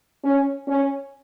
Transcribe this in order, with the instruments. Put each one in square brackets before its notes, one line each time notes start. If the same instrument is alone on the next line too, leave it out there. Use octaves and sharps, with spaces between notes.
[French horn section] C#4
C#4